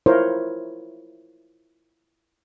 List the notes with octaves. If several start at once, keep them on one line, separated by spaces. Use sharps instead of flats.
E4 F4 A#4 C5 C#5